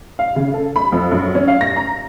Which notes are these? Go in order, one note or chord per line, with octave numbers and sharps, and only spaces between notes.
F5
C#3
A4
B5
F2
F#2
C#4
F5
A#6
A#5